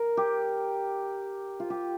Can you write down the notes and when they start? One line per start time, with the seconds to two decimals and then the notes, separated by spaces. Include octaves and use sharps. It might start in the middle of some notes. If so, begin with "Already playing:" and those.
Already playing: A#4
0.17 G4
1.60 F4
1.70 G4